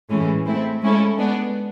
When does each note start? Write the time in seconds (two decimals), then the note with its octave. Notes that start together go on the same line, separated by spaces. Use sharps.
0.10 A2 E3 G#3 C#4
0.46 A3 C4 E4
0.81 G#3 C#4 E4 A4
1.18 G#3 B3 D4